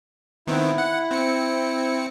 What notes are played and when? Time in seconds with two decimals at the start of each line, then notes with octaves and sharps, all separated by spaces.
0.47 D#3 B3 C4 E4
0.78 F#5
1.11 C4 C#7